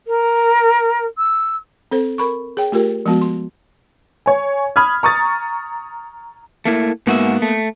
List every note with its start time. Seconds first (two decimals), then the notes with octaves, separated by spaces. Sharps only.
0.07 A#4
1.18 E6
1.91 C4 A4 C5
2.18 A#4 B5 C#6
2.57 G#4 C#5 G5
2.72 A3 F4 G4 A#4
3.06 F3 G#3 B3 F#4
3.22 C6
4.26 C#5 G#5
4.76 B5 D#6 F6 G#6
5.03 A#5 C#6 D#6 A6
6.65 A3 A#3 E4
7.07 G#2 A#3 B3 F#4 E5
7.42 A3